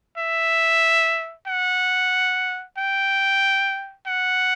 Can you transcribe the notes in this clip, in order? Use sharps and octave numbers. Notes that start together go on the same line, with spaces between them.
E5
F#5
G5
F#5